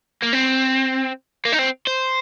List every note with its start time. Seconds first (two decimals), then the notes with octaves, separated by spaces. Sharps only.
0.22 A#3
0.33 C4
1.45 A#3
1.52 D#4
1.59 C4
1.87 C5